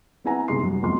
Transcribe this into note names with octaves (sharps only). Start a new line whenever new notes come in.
B3 C4 E4 F#5 G#5 A#5
G1 C3 G#3 D#4 C6 C7
F#2 G3
F1 B1 F#2 F4 C6